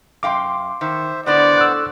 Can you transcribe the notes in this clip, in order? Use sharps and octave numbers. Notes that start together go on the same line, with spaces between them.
F#2 F5 G5 C6 D6
D#3 C5 E5
A2 D3 B3 D4 C5 D5 F#5
E6 F#6